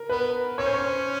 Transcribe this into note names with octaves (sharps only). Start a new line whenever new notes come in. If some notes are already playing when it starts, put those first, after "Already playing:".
Already playing: A#4
B3 B4
C#4 C#5
C5
C#5